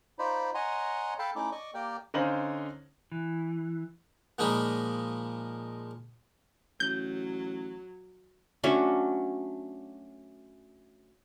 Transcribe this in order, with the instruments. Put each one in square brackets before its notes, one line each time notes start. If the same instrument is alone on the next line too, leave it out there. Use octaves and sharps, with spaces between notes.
[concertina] D#4 F4 C5 D5 B5
C#5 D#5 F#5 G#5 A#5 C6
A4 F5 G5 A5 B5
A3 C#4 D#4 E4 D6
D5 D#5 C#6 D6
A#3 G4 A#4 D5 G5
[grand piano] D3 C#4 D#4 C5 F5 F#7
[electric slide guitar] E3
[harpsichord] A#2 F3 G#3 A#3 D#4 B5
[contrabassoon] A1 [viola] F#3 [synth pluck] G6
[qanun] F#3 A3 C#4 D4